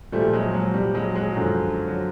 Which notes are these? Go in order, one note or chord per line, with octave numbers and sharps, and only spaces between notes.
A#2 F3 G3 A3
F#3 G#3
F#3
G3
F#3 G#3
F#3 G#3
F#2 D3 F3
F#3